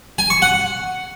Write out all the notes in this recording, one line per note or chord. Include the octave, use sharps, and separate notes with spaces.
G#5
C#6
F#5